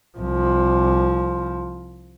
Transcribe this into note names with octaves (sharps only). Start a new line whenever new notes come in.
C2 F3